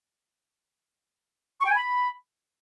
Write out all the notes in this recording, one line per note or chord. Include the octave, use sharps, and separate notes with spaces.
C#6
G5
G#5
B5